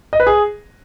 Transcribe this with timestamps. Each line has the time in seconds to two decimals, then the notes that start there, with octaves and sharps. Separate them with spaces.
0.13 D#5
0.20 B4
0.27 G#4